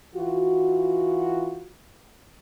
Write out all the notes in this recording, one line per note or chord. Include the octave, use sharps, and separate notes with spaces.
E3 F4 F#4